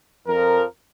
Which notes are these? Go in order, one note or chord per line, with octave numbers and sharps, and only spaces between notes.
F2 F3 A#4